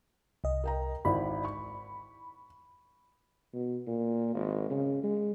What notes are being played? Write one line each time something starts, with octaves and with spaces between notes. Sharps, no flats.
C2 D#5
A#4 G5 A#5
G#1 E4 D5 B5
C#6
B2
A#2
G#1
C#3
G#3